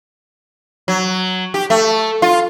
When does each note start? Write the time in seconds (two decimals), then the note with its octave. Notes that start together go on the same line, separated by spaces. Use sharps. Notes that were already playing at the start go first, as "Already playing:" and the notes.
0.88 F#3
1.54 G4
1.70 A3
2.22 F4